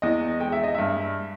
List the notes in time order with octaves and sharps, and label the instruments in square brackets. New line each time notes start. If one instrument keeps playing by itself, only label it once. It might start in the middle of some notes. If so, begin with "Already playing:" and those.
[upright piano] E2 D#5
G#3 G5
E5
D#5
G2 E5